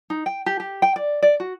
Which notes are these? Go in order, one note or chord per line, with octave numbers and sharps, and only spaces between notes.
D#4
G5
G4
G4
G5
D5
D5
F#4